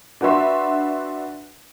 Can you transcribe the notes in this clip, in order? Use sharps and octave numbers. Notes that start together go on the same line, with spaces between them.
D4 F#4 B4 E5 C6